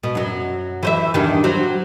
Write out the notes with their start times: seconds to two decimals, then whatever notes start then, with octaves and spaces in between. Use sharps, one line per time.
0.03 B2
0.15 F#2 F#3
0.83 E3 C5 E5
1.14 E2 G2 D#3
1.44 F#3 C4